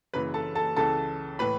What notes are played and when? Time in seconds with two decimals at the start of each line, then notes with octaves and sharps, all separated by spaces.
0.14 F#1 F#2 C#3 E3 B4 B5
0.34 A4 A5
0.55 A4 A5
0.76 C#2 C#3 E3 A4 A5
1.39 A2 E3 B4 B5